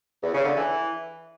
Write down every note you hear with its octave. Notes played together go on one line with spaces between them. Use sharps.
E2
C#3
D3
E3